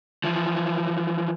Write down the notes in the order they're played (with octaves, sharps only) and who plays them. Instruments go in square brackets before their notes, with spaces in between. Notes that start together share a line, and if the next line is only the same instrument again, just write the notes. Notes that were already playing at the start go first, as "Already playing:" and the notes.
[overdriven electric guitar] E3 F3